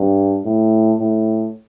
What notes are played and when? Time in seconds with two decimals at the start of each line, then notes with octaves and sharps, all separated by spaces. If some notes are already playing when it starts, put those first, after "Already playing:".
Already playing: G2
0.45 A2
0.99 A2